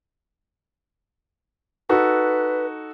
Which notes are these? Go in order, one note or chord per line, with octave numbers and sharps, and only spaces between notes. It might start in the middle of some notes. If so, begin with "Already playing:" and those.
D#4 F#4 A4 B4